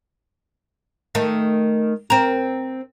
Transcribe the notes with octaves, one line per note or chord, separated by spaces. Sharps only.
D#3 A3
C4 A#4